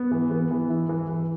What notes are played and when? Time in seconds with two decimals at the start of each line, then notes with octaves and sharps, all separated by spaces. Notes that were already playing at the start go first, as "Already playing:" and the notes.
Already playing: B3
0.11 E3
0.31 B3
0.51 E3
0.70 E4
0.89 E3
1.09 E3